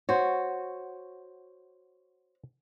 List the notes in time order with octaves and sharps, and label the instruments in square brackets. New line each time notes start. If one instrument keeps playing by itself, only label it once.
[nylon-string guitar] F#4 [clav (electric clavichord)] C5 C#5